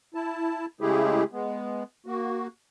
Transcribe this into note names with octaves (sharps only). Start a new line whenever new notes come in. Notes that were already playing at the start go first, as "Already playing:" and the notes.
E4 A5
C#3 G#3 A3 E4 G4 G#4
G#3 B3
A#3 F#4